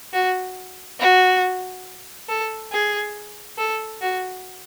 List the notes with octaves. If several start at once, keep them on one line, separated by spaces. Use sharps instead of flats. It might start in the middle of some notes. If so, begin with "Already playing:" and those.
F#4
F#4
A4
G#4
A4
F#4